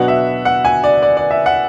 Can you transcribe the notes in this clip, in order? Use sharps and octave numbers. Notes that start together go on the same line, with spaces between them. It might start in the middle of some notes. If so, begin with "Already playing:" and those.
Already playing: B2 F#3 B3 D4 F#5
E5
F#5
G#5
D5
D5
D5
E5
F#5